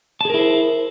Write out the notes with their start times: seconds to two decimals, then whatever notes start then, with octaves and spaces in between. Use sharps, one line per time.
0.21 A5
0.25 G#4
0.30 A#4
0.34 E4
0.39 C5